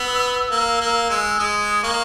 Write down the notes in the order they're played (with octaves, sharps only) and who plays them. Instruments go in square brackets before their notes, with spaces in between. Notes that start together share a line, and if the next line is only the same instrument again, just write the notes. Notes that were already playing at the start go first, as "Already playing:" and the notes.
Already playing: [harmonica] B3 [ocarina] E6
[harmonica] A#3
A#3
G#3
[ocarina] E6
[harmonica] G#3 [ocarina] D#6
[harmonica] A#3 [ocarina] C#6